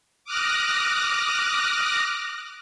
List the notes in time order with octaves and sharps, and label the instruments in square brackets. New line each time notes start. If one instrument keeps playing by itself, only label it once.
[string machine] D6 D#6 F6 F#6 A#6